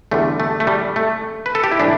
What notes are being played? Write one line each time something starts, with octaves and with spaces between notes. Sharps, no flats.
E2 D3 G3 A3
A3
A3
G3
A3
B4
A4
G4
E4
A2 E3 G3 D4